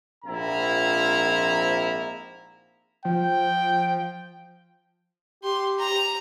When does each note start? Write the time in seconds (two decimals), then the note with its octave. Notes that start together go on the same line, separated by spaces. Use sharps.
0.25 A#1 G#2 F3 C4 E4 A#5
3.05 F3 G5
5.44 G4 C6
5.79 A#5